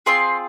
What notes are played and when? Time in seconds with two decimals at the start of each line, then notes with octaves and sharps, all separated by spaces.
0.06 C4 F4 G#4 C6